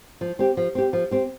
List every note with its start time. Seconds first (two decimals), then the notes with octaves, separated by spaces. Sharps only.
0.21 F3
0.39 C4 G4
0.57 F3
0.75 C4 G4
0.93 F3
1.11 C4 G4